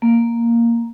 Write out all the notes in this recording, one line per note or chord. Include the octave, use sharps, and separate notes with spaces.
A#3